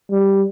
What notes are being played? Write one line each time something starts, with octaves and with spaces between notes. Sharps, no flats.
G3